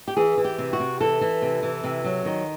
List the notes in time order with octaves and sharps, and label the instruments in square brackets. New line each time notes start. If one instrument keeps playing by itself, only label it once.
[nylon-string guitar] G4
E3 G#4
E3
G4
C3
F#4
C3
E3 A4
E3
C3
E3
C3
F#3
D#3